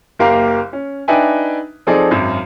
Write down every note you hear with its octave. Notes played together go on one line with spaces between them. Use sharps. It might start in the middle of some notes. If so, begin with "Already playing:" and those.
F#1 A#3 G4 A#4 F5
C#4
D4 D#4 B4 E5 G5 G#5
F3 C4 D#4 G#4 A4 D5
G#1 F#2